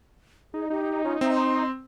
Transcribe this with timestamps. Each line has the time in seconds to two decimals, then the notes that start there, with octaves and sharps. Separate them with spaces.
0.54 D#4 G#4
0.70 D#4 G4
1.04 C#4 F4
1.21 C4 C5 E5
1.35 C6